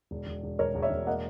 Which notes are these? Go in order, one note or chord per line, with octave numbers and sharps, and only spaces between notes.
E1
E1
E1
E1 A#4 C#5
E1
C#5 E5
E1
A#3 D#5 F#5